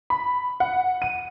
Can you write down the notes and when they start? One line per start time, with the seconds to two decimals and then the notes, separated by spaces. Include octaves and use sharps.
0.10 B5
0.60 F#5
1.02 D#7